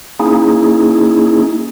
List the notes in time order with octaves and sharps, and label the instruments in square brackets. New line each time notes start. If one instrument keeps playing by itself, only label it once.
[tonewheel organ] A#3 C#4 D#4 E4 G#4